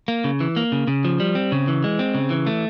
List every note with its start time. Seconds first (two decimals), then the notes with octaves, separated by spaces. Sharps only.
0.08 A#3
0.24 C#3
0.40 E3
0.56 A#3
0.72 C#3
0.87 C#3
1.05 F3
1.20 G3
1.35 C4
1.52 C#3
1.68 E3
1.84 G#3
1.99 C4
2.15 C#3
2.30 E3
2.47 A3